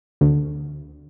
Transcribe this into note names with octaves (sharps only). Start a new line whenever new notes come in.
D2